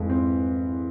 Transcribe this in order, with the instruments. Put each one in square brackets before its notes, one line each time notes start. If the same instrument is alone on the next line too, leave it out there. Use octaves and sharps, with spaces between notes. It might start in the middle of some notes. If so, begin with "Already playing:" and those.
Already playing: [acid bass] F2 [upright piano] G#2 E3
[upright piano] C4